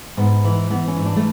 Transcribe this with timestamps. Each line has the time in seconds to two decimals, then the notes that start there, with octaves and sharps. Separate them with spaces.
0.17 G#2 B3
0.45 E3
0.70 E3 B3
0.88 C#4
0.96 G#2
1.06 D4
1.16 A3